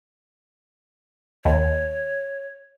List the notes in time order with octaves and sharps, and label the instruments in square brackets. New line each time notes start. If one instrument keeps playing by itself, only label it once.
[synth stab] D#2 [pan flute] C#5